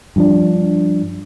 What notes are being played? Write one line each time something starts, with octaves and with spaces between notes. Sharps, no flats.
G2 F3 D4